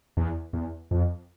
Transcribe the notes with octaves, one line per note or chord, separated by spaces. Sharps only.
E2
E2
F2